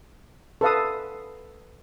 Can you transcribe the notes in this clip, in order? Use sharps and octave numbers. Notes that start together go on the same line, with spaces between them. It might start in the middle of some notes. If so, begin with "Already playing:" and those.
A4 B4 F5 D#6